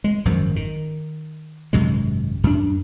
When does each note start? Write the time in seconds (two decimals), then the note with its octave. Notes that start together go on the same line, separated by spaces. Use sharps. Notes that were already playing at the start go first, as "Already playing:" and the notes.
0.04 G#3
0.25 G#1 F#2 D#3 F3
0.56 D#3
1.73 G#1 F#2 C3 G#3
2.44 F#2 D4